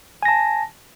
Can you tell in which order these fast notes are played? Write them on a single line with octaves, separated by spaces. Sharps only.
G#5 A#6 A5